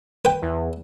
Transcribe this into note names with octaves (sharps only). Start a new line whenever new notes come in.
B4 G5
E2